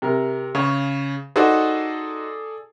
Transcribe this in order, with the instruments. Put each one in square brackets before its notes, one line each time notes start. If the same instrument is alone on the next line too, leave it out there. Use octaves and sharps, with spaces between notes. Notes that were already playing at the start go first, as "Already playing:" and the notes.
[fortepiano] C3 A#4
[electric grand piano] C#3 [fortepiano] C#5 C#6
[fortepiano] D#4 F#4 C5 [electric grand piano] G#4 A4 D5